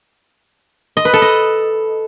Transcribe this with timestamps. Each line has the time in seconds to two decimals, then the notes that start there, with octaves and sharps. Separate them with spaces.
0.97 D#5
1.05 B4
1.14 A4
1.22 D#5